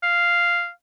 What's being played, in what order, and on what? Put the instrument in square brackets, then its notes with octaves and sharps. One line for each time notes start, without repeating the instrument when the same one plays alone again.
[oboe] F5